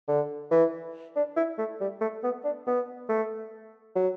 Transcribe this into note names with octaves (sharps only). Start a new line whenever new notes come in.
D3
E3
D4
E4
A3
G3
A3
B3
D4
B3
A3
F#3